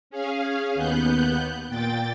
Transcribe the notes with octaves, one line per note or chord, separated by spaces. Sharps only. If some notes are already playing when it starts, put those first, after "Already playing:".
C#4 G#4 F5
D#2 B3 F#6 G6
A#2 G5 A6